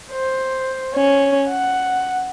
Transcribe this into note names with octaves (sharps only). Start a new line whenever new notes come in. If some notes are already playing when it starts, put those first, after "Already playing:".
C5
C#4
F#5